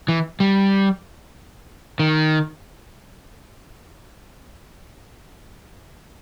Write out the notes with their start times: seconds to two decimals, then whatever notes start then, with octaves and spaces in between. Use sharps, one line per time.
0.08 E3
0.40 G3
1.99 D#3